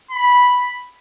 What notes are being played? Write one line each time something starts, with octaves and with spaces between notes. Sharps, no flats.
B5